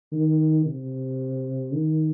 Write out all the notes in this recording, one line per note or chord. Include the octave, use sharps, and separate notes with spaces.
D#3
C3
D#3